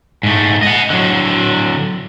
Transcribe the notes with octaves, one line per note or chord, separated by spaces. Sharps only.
G#2 A3
D#5 F#5
D3 F#3